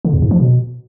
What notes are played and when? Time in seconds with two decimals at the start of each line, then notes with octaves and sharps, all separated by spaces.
0.05 D3
0.13 E2
0.22 G#2
0.31 F3
0.40 B2